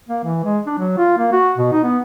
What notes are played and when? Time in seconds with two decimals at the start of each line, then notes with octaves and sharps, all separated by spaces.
0.09 A#3
0.24 E3
0.44 G#3
0.67 D4
0.79 F#3
0.98 F4
1.18 A#3
1.32 F#4
1.58 B2
1.72 D#4
1.83 B3